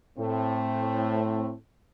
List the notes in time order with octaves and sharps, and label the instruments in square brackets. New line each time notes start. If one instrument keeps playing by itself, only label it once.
[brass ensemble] A2 A3 C4